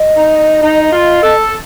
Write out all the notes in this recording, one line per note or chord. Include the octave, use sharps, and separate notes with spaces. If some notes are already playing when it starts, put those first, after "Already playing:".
Already playing: D#5
D#4
D#4
F4
A4